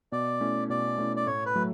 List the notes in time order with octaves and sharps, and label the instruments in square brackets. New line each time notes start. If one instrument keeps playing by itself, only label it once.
[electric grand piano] B2 [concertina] D5
[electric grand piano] A3 C#4 E4
[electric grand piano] B2 [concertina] D5
[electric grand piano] A3 C#4 E4
[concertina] D5
[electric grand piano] A2 [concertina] C#5
[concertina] B4
[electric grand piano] F#3 A3